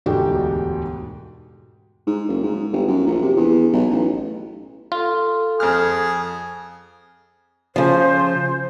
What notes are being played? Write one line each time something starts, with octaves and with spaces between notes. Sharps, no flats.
E1 D2 G#2 F#4 G4 G5
G#2
F#1
G#2
G1
F#2
A#1
C3
E2
B1
A1
F4 A4
F2 G#4 F6
C#3 F3 C5